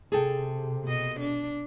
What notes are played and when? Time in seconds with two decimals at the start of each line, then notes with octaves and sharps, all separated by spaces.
0.12 C3 G#4 A4 G5
0.84 B2 D#5
1.21 D4